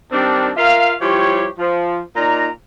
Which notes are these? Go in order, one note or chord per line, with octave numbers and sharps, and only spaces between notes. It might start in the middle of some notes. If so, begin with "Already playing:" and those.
D#3 G3 C4 D4
F4 A#4 E5 F5
F3 G3 E4 G4 C#5
F3
A#2 D#4 D5 A#5